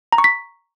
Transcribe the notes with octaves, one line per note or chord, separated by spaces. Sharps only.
A#5
C#6
B6